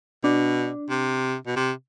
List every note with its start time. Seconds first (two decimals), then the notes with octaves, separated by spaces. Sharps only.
0.24 B2 D4
0.90 C3
1.47 B2
1.56 C3